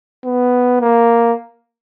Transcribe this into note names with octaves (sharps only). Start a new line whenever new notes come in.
B3
A#3